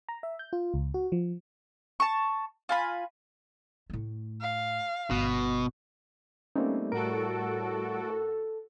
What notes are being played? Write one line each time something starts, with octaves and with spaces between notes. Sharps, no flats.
A#5
E5
G6
F4
C#2
F#4
F3
A5 C#6
F4 G#5 B5
A2 A3
F5
G1 B2
G3 A3 A#3 C4 C#4 D#4
A2 F#4 A4 A#4 D7
A4